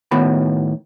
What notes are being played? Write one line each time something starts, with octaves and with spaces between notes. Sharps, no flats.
A2 D#3 B3 F#4 B5